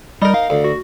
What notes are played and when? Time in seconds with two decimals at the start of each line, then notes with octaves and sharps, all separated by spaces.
0.22 G3 D#4 A#4
0.34 F5
0.50 D2
0.64 F#4